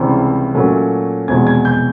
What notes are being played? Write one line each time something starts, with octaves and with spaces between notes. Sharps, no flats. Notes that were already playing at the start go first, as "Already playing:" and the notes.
Already playing: C#2 C3 E3 G3 C4
A#2 F#3 A3 C#4
F1 E2 B2 G#3 C4 G#6
G#6
G6